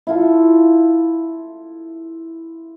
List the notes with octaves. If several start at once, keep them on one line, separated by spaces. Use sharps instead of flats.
E4 F4 A4